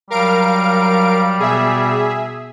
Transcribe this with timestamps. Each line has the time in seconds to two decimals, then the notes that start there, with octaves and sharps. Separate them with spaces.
0.10 F#3 G3 A#4 F5 D7
1.40 B2 G#4 E5